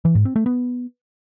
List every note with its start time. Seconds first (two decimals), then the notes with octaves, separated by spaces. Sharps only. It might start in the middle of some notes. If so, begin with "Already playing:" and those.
0.05 E3
0.15 G#2
0.25 C4
0.36 A3
0.46 B3